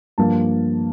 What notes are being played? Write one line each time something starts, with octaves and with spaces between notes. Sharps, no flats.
G2 F3 A#3 A5